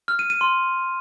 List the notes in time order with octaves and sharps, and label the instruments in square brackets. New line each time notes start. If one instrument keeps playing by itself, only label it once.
[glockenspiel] F6
D#7
D#7
C6